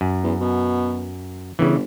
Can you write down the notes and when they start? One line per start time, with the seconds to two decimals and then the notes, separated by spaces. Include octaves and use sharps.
0.01 F#2
0.24 E2
0.41 B2
1.59 G1 C#3 E3